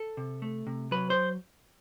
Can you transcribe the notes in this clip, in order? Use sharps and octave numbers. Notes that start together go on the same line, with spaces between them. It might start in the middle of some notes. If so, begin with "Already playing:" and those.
Already playing: A4
C3
A3
C3
F#3 B4
C5